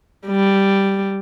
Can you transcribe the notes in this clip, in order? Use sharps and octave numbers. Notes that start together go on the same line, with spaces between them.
G3